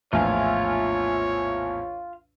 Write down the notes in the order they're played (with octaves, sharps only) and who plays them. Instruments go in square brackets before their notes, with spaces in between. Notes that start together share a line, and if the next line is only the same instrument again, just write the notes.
[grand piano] A#1 E2 A2 [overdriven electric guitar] F4 F5 [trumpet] C#5 [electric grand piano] E5 G#5